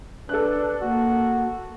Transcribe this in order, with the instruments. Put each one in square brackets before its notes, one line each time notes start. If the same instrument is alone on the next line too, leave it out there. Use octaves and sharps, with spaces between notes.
[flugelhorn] D4 [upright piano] A4 F#6 [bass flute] B4
[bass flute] A#3 [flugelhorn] F#4